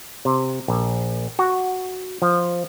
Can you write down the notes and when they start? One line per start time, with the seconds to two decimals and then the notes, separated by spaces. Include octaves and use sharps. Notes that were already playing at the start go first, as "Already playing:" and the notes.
0.25 C3
0.68 A#1
1.39 F#4
2.22 F3